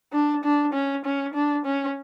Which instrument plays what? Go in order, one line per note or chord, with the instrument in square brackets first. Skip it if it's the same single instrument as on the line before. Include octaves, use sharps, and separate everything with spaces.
[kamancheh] D4
D4
C#4
C#4
D4
C#4